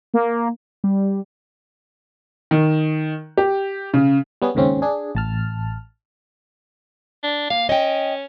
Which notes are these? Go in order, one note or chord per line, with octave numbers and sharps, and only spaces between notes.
A#3
G3
D#3
G4
C#3
G3 B3 C#4 G#4
D#2 G#2 C#3 C4 C#4
D4 G#4
A1 A5 F6
D4
A#3 F5
C#4 D#5 G5